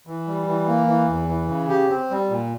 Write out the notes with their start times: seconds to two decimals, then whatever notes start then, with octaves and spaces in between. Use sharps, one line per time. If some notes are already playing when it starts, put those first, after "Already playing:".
0.07 E3
0.27 G3
0.47 E3
0.67 A#3
0.87 E3
1.08 E2
1.29 E3
1.48 C#3
1.69 G4
1.89 C4
2.11 G3
2.30 A#2